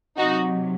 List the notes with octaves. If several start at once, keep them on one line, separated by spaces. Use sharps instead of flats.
C3 F#3 D#4 F#4